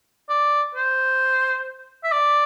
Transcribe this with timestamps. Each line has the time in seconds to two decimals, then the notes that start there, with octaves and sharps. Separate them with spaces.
0.29 D5
0.75 C5
2.04 E5
2.12 D5